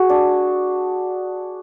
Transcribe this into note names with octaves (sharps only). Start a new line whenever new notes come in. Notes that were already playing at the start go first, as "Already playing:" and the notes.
Already playing: F#4 G#4
D4